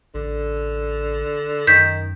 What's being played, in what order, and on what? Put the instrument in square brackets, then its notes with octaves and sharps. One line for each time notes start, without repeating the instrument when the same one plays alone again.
[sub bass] A1 [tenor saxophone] D3
[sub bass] F#2 [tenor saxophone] D#3 [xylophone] G6 B6 E7